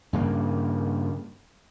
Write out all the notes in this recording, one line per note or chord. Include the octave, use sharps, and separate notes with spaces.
G2 C#3 A#3